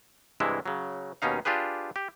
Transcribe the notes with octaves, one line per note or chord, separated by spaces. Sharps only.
G2 C3 E3 G#3 E4
C#3 F#3
D#2 B2 C#4 D#4 F5
D4 F4 G4 G#4 B4
G4